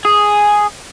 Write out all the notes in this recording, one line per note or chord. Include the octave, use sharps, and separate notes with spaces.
G#4